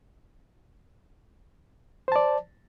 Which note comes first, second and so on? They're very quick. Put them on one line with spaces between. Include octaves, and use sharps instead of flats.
C5 A5 D5